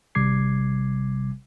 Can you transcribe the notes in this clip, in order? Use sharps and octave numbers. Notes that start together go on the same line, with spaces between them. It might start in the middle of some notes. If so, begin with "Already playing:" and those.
G#1 C3 G3 D6 G#6 C7